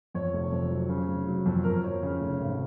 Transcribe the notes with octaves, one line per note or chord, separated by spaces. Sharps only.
F2 C#5
F1
F2
F#3
C#3
F1
F#3
F2
F2 A#4
C5
F2 C#5
C#3
F1
G#1